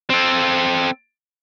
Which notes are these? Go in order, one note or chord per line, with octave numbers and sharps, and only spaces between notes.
C4 A4